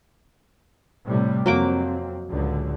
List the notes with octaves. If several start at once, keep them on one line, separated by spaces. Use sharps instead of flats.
A2 C3 G3
F2 F#3 A#3 C4 D6
C#2 A2 D3